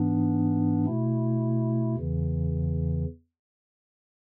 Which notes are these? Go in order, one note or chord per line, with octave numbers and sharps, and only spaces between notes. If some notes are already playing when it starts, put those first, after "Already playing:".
Already playing: G#2 E3 B3 D4
B2 A3 E4
E2 C#3 E3